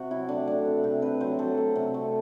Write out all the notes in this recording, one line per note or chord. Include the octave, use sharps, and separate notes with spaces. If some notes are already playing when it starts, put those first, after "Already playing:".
Already playing: C3 F#4
F#3 E4
A3 D4
A3 D4
C3
C3 G4
C3 B4
F#3 C5
F#3 A4
A3
C3
A3